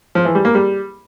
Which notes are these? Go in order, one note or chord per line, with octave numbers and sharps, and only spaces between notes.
F3
E3
G3
A#3
G3